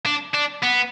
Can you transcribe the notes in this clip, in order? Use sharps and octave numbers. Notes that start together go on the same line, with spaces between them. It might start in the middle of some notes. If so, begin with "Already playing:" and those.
D4
D4
B3